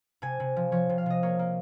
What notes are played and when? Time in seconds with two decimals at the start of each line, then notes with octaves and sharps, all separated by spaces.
0.22 C3 G#5
0.40 C3
0.56 F3
0.72 F3 C#5
0.89 C3
0.98 F5
1.06 C3 D#5
1.23 A#3 C#5
1.39 A#3